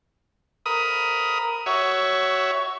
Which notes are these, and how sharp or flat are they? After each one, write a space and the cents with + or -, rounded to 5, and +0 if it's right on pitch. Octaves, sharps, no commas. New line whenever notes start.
A#4 +0 B5 +0 D#6 +15
F#4 +20 C#5 +10 E5 +0